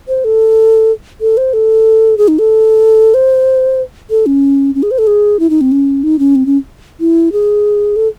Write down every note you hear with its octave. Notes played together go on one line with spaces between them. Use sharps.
C5
A4
A4
C5
A4
G#4
D#4
A4
C5
A4
C#4
C#4
G#4
C5
A4
G#4
E4
D#4
C4
C#4
D#4
C#4
C4
C#4
E4
G#4
A4